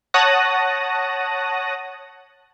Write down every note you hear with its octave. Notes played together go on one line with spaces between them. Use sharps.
C#5 F#5 A5 D#6 F#6 A#6